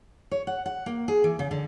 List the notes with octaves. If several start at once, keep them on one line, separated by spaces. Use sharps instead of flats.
C#5
F#5
F#5
A#3
G#4
E3
C#3
D3